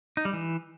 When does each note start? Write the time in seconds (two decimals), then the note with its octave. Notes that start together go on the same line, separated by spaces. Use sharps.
0.17 D#4
0.25 G3
0.33 E3